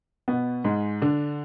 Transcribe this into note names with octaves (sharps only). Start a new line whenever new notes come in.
B2 B3
G#2 G#3
D3 D4